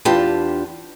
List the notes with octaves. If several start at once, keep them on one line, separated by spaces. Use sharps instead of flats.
E2 D4 F4 G4 A5